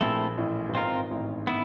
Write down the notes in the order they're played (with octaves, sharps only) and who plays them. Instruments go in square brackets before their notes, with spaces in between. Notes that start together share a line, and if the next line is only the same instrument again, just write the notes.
[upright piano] A#1 A#2 [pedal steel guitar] A3 C4 E4 A4
[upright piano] A1 A2
G2
[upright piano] G#1 G#2 [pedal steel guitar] C4 F4 A#4
[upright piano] A1 A2
[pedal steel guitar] B3 E4